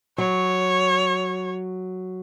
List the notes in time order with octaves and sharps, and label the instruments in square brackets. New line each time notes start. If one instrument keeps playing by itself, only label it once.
[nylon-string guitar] F#3 [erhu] C#5